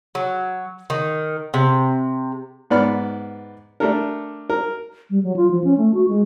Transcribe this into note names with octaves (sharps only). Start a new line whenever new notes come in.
F#3
D#3
C3
G#2 B3 D5 B5 F6
A3 D4 G4 A4 A#4
A#4
G3
F#3
F4
F3
C#4
A3
F#4
G#3